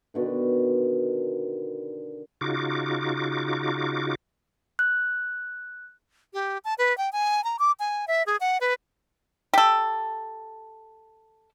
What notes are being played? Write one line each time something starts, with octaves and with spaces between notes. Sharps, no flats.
B2 D3 D#3
C#3 D#4 F4 F#4 D6
F#6
G4
A5
B4
G5
G#5
A#5
D6
G#5
E5
G#4
F#5
B4
G4 A4